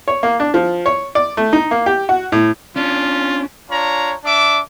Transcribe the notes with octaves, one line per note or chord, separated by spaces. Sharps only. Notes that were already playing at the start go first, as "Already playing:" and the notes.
C#5
A#3
D4
F3
C#5
D5
A3
D#4
A#3
G4
F#4
A2
C#4 D4 F4
D4 F4 C#5 A#5
D4 E5 D6